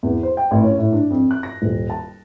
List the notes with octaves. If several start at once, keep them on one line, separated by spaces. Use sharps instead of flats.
E2
C5
G5
A1
C#4
A2
D4
F2
F#6
A#6
D#1
A5